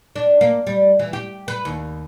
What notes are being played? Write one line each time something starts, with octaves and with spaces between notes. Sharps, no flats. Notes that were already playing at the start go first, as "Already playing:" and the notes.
D4
A#3
G3
E3
G4
B4
D#2